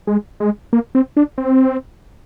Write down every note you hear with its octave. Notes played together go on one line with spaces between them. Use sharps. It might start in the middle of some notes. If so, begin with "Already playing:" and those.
G#3
G#3
A#3
C4
D4
C4